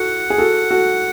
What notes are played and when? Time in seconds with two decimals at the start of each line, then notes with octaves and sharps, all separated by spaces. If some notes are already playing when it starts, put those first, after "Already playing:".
Already playing: F#4 A4 F#5
0.30 G#4
0.38 F#4 A4
0.71 F#4 A4